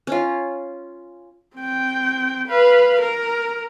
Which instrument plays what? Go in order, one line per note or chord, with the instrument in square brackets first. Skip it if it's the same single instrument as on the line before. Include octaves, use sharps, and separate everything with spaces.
[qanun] C#4 F4
[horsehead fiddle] C4 G5
B4 F5
A#4